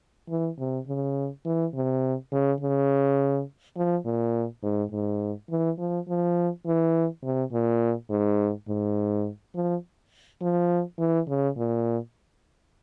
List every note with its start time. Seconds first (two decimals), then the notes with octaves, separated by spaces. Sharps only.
0.29 E3
0.59 C3
0.88 C#3
1.45 E3
1.74 C3
2.32 C#3
2.61 C#3
3.76 F3
4.05 A#2
4.63 G#2
4.92 G#2
5.50 E3
5.79 F3
6.08 F3
6.66 E3
7.23 C3
7.53 A#2
8.10 G#2
8.68 G#2
9.55 F3
10.41 F3
10.99 E3
11.29 C#3
11.57 A#2